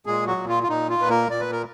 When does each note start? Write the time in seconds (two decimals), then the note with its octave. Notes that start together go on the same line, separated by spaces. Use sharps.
0.06 A#2 G#3 G#4
0.27 F#3 F#4
0.37 A#2
0.48 F4
0.63 F4
0.68 A#2 D#4
0.90 F4
0.99 A#2 B4
1.09 A#3 A#4
1.30 A#2 D5
1.40 B4
1.52 A#4